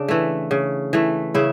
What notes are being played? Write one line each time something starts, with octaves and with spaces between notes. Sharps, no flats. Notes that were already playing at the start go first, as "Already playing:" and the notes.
Already playing: C#3 D4
E3 A3
C#3
E3 A3
C#3 E4